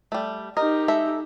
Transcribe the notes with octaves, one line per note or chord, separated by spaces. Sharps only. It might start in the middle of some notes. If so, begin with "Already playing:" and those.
G3 A3
D#4 G4 A#4 D#5
G#3 A4 E5